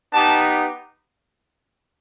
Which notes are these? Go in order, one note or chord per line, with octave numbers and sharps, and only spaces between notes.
B3 D#4 G4 A5